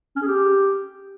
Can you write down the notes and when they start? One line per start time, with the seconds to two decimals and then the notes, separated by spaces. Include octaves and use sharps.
0.16 C#4
0.22 G#4
0.28 G4